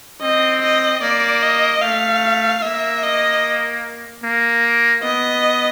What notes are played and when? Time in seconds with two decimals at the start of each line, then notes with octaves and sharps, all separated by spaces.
0.22 C4 D#5
0.63 D#5
1.02 A#3 D5
1.43 D#5
1.82 A3 F5
2.62 A#3 E5
3.03 D#5
4.24 A#3
5.03 B3 D#5